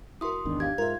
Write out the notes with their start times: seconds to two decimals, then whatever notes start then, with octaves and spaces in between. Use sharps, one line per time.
0.21 E4 F#4 A#4 C6 D#6
0.45 G#1 E2 D#3 D4
0.60 G4 F5 G#6
0.78 G#2 F4 A#4 E5 G#6